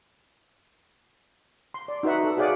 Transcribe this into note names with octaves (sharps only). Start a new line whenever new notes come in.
C6
D5
D#4 F#4 B4 E5 F#5
A4
F#4 G#4 C#5 D5 F5 F#5